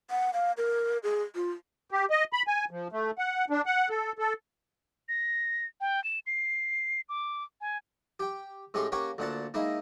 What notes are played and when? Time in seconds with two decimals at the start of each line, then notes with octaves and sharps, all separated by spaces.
0.10 F#5
0.33 F5
0.57 A#4
1.03 G#4
1.35 F4
1.91 G4
2.10 D#5
2.33 B5
2.47 G#5
2.71 F3
2.92 A3
3.18 F#5
3.50 D4
3.66 F#5
3.89 A4
4.18 A4
5.09 A#6
5.81 G5
6.04 E7
6.27 C7
7.09 D6
7.61 G#5
8.20 G4 G5
8.74 A2 G#3 C#4 G4 C#5 C6
8.92 A#3 C#4 G4 C#5 F#5
9.18 D2 A#2 F#5 A5
9.54 G#3 A#3 D#4 E4